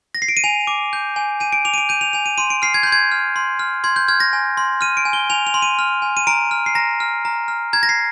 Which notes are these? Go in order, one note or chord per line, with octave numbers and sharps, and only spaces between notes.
A#6
C7
D7
D#7
G#5 F7
D6
G6
G#5
G#5 D#7
D7
D6 F7
D#7
D7
G6 D#7
F7
G#5 F7
D#7
C6 D#7
D7
F6 C7
G#6
C6 G6
G#6
F6
C6
F6
C6 G#6
G6
F6 G#6
A#6
G#5
C6
F6 D#7
D7
G#5
G7
G#5 F7
F7
C6
D#7
F6
G#5
D#7
A#5 D7
F6
C7
A#5 A#6
F6
A#5
F6
A#5 G#6
A#6
C7